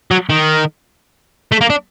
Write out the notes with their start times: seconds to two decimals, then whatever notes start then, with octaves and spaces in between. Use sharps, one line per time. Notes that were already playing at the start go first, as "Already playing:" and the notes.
0.11 F#3
0.30 D#3
1.52 A3
1.61 A#3
1.70 D4